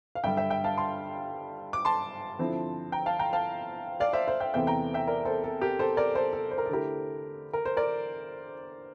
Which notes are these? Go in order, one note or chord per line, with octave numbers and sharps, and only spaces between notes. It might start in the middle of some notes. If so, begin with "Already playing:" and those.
F5
G2 D3 G3 E5 G5
E5 G5
E5 G5
F5 A5
A5 C6
D6
A5 C6
D3 F3 C4 E4
G5 A#5
F5 A5
G5 A#5
F5 A5
D5 F5
C5 E5
C5 E5
E5 G5
E2 C3 E3 A3 C4 E5 G5
G5 A#5
E5 G5
A#4 D5
A4 C5
A4
G4 A#4
A4 C5
A#4 D5
A4 C5
A4
C5
A#4
A4
D3 A3 E4 G4 A#4
A#4
C5
A#4 D5